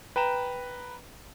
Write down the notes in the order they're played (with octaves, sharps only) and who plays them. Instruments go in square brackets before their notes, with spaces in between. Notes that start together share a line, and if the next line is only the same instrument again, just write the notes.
[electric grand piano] B4 G5 A#5 E7